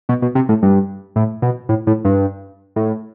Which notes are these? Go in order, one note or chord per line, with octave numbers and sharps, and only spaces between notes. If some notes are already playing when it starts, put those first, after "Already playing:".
B2
B2
C3
A2
G2
A2
B2
A2
A2
G2
A2